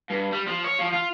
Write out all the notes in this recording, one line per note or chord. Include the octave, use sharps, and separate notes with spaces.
G2
G3
F3
C#5
F3
F4